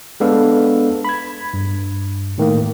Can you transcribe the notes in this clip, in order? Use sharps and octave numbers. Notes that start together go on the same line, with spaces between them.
G#3 B3 D4 A4 B4 F5
B5 G#6
G2
A2 D#3 A3 A#3